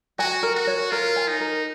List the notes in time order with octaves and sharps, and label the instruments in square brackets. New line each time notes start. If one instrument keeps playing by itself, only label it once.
[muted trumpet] F#4 [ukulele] G#5
[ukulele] A#4
[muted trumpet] F#4
[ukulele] C#5
[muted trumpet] F4 [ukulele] A#4
[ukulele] G#5
[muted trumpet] D#4
[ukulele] A#4